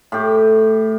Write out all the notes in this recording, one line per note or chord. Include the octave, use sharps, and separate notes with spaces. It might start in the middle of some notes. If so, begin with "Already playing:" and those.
A2 G4